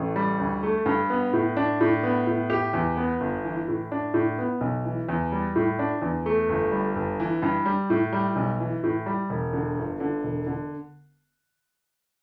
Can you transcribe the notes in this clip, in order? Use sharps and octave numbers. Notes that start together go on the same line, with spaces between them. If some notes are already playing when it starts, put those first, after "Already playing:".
Already playing: A1 A3
G3
D2
A3
G2
B3
A2
D4
A2
B3
A2
G4
E2
B3
G1
E3
A2
D4
A2
B3
B1
E3
E2
G3
A2
D4
E2
A3
G1
G3
G1
E3
G2
G3
A2
G3
B1
E3
A2
G3
E1
D3
G1
D3
E1
D3